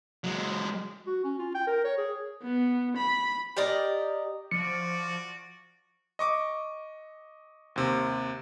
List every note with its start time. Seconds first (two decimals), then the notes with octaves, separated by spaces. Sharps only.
0.24 F#3 G#3
1.07 F#4
1.24 C#4
1.39 F4
1.55 G5
1.67 A#4
1.84 C#5
1.98 G#4
2.43 B3
2.97 B5
3.56 G4 A#4 D5 D#5
4.51 F3 F#4 D5 C#7
6.19 D#5 C#6 D6
7.76 D#2 C3